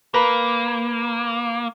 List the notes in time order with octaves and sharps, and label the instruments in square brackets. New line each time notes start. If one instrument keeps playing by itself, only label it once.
[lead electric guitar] A#3 [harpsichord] A#4 B4